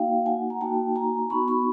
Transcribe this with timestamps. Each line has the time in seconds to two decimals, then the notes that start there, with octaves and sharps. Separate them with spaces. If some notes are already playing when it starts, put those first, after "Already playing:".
Already playing: A#3 D#4 F#4 F5 G5
0.26 F#5 G#5
0.50 A#5
0.61 A#3 D#4 F#4 G5 A5
0.96 G#5 A#5
1.30 B3 D#4 F#4 B5 C#6
1.48 B5 C#6